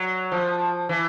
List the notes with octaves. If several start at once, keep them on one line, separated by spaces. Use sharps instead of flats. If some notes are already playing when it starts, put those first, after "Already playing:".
Already playing: F#3
F3
E3